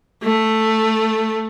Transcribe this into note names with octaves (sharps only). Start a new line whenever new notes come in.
A3